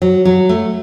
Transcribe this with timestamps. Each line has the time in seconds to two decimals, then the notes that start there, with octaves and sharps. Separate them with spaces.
0.02 F#3
0.25 F#3
0.49 A3